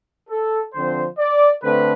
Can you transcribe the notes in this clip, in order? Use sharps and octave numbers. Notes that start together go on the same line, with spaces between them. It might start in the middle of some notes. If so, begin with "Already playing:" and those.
A4
D3 F3 C4 C5
D5
D3 A3 C4 B4